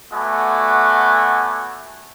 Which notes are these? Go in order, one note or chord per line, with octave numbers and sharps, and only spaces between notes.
A3 B3 F#4 D5 G#5